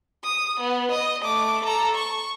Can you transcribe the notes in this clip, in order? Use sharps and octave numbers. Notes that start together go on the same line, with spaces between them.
D#6
B3
D#5
A3 D6
A4 A#5
C#6